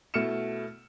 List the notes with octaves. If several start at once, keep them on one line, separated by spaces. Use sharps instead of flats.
B2 A3 E4 F6 C#7 E7